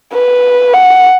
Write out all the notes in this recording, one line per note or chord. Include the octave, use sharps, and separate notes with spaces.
B4
F#5